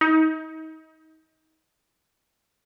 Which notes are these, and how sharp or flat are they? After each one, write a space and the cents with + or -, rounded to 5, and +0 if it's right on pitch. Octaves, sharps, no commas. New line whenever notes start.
D#4 +30